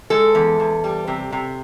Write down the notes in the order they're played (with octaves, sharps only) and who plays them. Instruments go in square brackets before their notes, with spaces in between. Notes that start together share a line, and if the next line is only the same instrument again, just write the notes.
[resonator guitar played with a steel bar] G#3 A4
E2
E2
G3
C3
C3